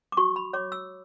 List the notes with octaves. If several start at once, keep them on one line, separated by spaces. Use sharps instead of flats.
D6
F#4 C#6
B5
C#5 D6
E6